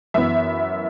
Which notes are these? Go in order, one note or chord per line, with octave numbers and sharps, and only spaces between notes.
F#2 E3 B3 E5